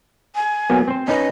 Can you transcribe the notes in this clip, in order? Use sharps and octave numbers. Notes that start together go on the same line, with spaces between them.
G#5
F#3 A#3 B3
C4 C5
C#4 D#4 B4 D#5